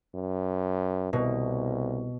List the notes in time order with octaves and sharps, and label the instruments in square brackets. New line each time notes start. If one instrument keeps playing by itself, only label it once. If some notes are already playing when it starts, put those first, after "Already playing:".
[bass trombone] F#2
[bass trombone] C2 [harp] B2